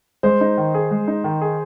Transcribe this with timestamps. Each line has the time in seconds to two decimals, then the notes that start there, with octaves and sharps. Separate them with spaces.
0.23 G#3 C5
0.41 D#4
0.58 D#3
0.74 G#4
0.91 G#3
1.08 D#4
1.24 D#3
1.41 G#4